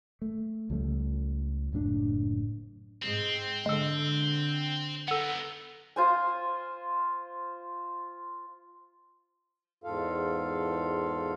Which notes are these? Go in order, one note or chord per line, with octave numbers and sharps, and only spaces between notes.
A3
C#2 F3 G3 A3
F#1 A2 C#4 D4
G#2 C4
D3 G#3 A4
B3 D#4 A4 F#5
F4 C5 G#5
E2 G#2 F4 A4 F5